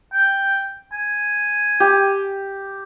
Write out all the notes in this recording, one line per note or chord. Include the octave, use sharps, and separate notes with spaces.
G5
G#5
G4